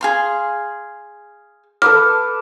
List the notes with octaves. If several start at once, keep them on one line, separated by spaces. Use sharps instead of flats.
G#4 F5 C6
A4 B4 D6 F6